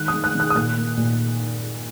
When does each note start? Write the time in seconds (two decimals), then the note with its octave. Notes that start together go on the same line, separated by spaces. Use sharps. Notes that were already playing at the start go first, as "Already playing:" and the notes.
Already playing: D#3 G#3 F#6
0.08 D#6
0.13 D#3
0.24 F#6
0.35 D#3 F#6
0.50 D#6
0.55 A#2 F#6
0.77 A#3
0.97 A#2